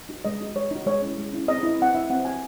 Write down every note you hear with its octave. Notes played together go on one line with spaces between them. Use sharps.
D#4 F#4
G#3 D#5
D#4 F#4
G#3 C#5
D#4 F#4
G#3 C#5
C#4 E4
G#3
C#4 E4
C4 D#5
E4
C4 F#5
E4 E5
C4 F#5
F#4 G#5